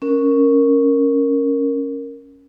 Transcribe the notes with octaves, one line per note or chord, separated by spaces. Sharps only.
C#4 A#4